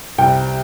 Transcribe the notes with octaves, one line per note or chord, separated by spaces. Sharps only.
C2 C3 G3 G5